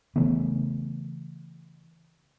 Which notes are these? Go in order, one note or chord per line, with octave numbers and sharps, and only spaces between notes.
C#3 E3 A3 B3